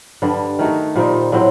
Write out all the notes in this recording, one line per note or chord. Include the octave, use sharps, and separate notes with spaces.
G2 D3 G3
D#3 A3 D#4 F#4
A#2 G3 C4 D#4
A2 F#3 C4